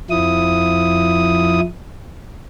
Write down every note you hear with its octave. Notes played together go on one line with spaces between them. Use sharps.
F2 F3 E4 D#6